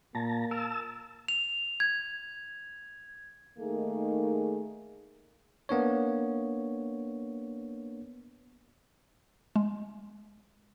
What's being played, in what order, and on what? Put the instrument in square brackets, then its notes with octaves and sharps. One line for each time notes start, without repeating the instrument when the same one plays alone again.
[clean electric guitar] A#2 [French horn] A#3 [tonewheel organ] A5 A#5
[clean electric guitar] A#4 [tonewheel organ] A5 E6
[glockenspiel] F7
G#6
[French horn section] D#3 A3 A#3 D#4 G#4
[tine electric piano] A#3 B3 D4 C#5
[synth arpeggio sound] G#3